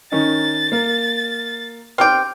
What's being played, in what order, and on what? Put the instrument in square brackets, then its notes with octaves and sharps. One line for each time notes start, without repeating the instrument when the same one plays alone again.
[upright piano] D#3 C#4 D#4 [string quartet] A6
[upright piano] A#3 A#4
[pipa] C4 G4 G5 [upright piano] D6 F6